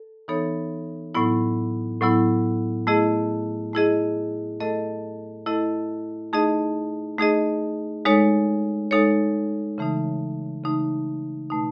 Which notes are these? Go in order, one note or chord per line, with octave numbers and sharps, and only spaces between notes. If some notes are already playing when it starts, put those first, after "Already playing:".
Already playing: A4
E3 B3 D#4 A4 C#5
A2 F#3 B3 E4
A2 F#3 B3 E4
A3 E4 G#4 D#5
A3 E4 G#4 D#5
A3 E4 A4 D#5
A3 E4 A4 D#5
A3 D#4 G#4 D#5
A3 D#4 G#4 D#5
G#3 D#4 A4 C#5
G#3 D#4 A4 C#5
C#3 E3 A3 D#4
C#3 E3 A3 D#4
B2 A3 D#4